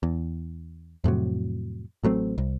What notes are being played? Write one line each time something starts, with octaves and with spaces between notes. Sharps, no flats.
E2
F2 A2 C3 F#3
A1 F#3 A3 C4
C2